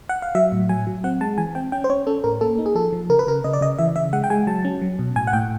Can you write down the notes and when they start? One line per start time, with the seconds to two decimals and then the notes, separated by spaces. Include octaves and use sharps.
0.09 F#5
0.22 F5
0.35 F#3 E5
0.52 A2
0.69 F#3 G#5
0.87 F#3
1.04 C4 F#5
1.21 G#3 A5
1.38 E3 G#5
1.55 C4 G5
1.72 C#4 G5
1.84 C5
1.90 C#4 C#5
2.07 C#4 A4
2.24 A2 A#4
2.41 A#3 A4
2.59 D#4
2.66 G#4
2.75 F3 A4
2.93 F3
3.09 C#3 A#4
3.19 B4
3.27 C#3 A#4
3.44 C#3 D#5
3.53 D5
3.61 C#3 D#5
3.79 E3 E5
3.96 C#3 E5
4.13 G#3 F#5
4.24 G5
4.30 G#3 G#5
4.47 F#3 A5
4.65 C#4
4.82 F#3
4.99 B2
5.16 A2 G#5
5.27 F#5
5.33 A2 G5